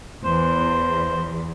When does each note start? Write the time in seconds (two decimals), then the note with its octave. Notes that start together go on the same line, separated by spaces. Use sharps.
0.25 E2 C5